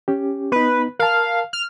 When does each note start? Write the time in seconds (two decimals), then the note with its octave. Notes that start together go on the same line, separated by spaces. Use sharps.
0.08 C#4 G4
0.52 B3 D#4 B4
0.99 A#4 F5 A5
1.53 F6